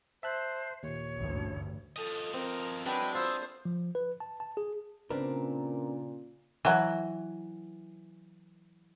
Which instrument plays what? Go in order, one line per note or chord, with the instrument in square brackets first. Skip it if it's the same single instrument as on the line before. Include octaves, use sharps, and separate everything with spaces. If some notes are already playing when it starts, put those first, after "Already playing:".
[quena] C5 [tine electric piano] E5 A5 F#6
[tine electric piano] D#2 A#2 [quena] C#5
[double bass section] A1 D2 G2
[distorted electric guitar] F3 D#5 [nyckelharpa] A4
[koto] C4 [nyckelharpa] A#4
[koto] F#3 D4 E4 [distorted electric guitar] G#3 [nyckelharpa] B4 [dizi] G5
[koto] F4 [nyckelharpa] C5 [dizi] E6
[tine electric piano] F3
B4
A5
A5
G#4
[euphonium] A#2 [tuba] C#3 [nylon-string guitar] C4 B4 [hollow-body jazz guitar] D4 A#4
[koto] E3 F#3